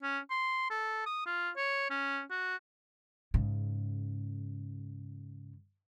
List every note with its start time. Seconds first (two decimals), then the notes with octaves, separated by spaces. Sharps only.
0.03 C#4
0.30 C6
0.70 A4
1.06 D#6
1.26 F4
1.57 C#5
1.90 C#4
2.31 F#4
3.34 G#2 C#3